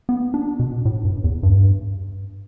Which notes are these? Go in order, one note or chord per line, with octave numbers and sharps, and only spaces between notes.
B3
D4
B2
A2
G2
E2
G2